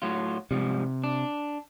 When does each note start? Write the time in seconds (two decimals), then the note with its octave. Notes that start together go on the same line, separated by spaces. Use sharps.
0.02 A2 F#3 F4
0.51 G#2 C3 F3 G3
1.04 D4